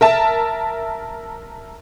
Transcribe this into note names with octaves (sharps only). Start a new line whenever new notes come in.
A#4 E5 A5